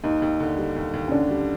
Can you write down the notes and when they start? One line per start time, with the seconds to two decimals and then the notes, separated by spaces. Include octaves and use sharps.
0.04 D#2 D#4
0.22 D#2
0.40 D3
0.58 G3
0.76 D#2
0.94 D#2
1.08 C#4
1.12 D3 D4
1.31 G3